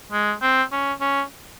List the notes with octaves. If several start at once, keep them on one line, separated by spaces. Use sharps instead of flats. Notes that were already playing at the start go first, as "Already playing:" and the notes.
G#3
C4
C#4
C#4